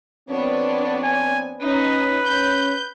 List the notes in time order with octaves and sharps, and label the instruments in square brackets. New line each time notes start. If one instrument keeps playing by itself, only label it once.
[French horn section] F2 C4 [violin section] B3 D4 C#5
[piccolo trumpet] G#5
[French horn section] C#4 [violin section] D#4 [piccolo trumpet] B4
[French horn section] C#4 [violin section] G6